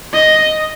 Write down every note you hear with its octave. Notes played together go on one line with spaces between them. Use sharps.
D#5